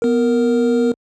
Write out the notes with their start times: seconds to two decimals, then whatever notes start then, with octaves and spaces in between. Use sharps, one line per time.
0.02 B3 A#4